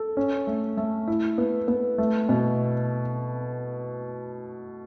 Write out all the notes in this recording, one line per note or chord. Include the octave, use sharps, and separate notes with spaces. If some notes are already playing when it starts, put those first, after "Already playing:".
Already playing: A4
C#4
A3
A3
E4
B3
B3
A3
B2